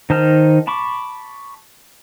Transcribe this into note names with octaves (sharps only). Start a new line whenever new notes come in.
D#3 D#4 C5 A5 F6
A5 B5 C#6 D6